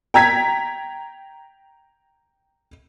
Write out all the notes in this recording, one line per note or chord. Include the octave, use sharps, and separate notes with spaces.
G5 A#5 G#6 B6